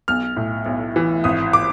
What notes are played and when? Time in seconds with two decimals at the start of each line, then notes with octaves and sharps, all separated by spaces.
0.08 B1 F6
0.36 A2
0.66 B1
0.96 E3
1.24 G#1 D#6
1.53 D6